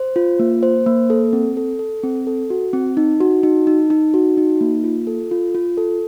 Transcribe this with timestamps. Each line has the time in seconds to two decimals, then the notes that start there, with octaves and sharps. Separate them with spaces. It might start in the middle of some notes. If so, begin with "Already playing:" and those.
Already playing: C5
0.16 F4
0.39 A#3
0.63 C5
0.86 A#3
1.10 A4
1.33 C4
1.57 A4
1.79 A4
2.04 C4
2.27 A4
2.50 F#4
2.73 C4
2.97 D#4
3.21 F#4
3.43 D#4
3.67 D#4
3.90 D#4
4.14 F#4
4.37 D#4
4.61 A#3
4.84 F4
5.07 A4
5.31 F4
5.55 F4
5.77 A4